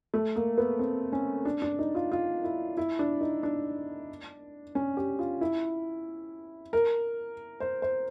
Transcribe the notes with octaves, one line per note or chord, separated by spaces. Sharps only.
A3
A#3
B3
C4
C#4
D4
D4
D#4
F4
F4
E4
E4
D4
D#4
D4
C#4
G4
F4
E4
A#4
C5
C5